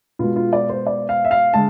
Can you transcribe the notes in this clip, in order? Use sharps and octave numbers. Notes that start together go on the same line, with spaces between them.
B2 G#3 F4
F4
D5
C5
D5
F5
E5
F5
D3 G#3 A5